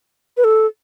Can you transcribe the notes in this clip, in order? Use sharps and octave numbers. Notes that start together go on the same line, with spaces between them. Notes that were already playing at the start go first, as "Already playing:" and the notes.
B4
A4